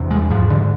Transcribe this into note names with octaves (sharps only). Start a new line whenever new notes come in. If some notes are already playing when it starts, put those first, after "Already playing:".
Already playing: E2 C3
G#3
G#2 F3
D3